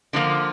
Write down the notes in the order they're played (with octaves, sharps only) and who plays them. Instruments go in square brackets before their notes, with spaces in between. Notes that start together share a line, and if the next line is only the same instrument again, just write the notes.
[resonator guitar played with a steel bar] D3 F3 A#3 F4